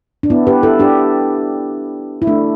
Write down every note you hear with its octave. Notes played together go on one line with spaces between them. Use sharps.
D4
B3 E4
G4 B4
E4 A4
D4 G4
E4
A3 D4